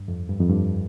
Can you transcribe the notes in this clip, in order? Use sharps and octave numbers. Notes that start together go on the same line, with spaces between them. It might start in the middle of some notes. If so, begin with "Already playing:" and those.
Already playing: G2
F2
G2
F2
G2